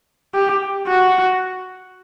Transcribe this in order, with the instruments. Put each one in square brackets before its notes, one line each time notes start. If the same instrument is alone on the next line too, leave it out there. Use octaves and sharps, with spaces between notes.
[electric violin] G4
F#4